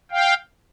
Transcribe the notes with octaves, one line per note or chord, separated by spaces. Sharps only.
F5 G5